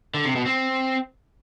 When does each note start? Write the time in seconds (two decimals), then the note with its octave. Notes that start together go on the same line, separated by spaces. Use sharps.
0.14 D3
0.25 C3
0.35 B2
0.46 C4